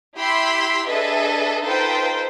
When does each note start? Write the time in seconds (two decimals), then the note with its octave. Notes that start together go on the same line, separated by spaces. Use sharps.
0.16 E4 G4 B5 C6 E6 C7
0.86 D4 G#4 A4 B4 D#5 E5
1.63 D#4 F4 A4 B4 C5 G5